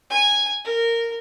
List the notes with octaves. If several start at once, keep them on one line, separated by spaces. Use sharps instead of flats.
G#5
A#4